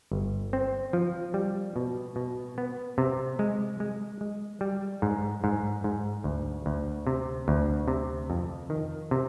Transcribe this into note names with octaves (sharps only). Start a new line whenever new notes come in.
G1
C4
F3
G3
B2
B2
B3
C3
G#3
G#3
G#3
G3
G#2
G#2
G#2
D2
D2
C3
D2
C3
F2
D#3
C3